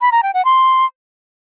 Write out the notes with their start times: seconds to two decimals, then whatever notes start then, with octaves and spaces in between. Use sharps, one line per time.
0.01 B5
0.12 A#5
0.23 G5
0.34 F#5
0.45 C6